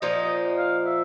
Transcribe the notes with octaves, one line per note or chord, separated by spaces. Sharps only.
A#2 F3 A#3 D#4 D#5
F5
E5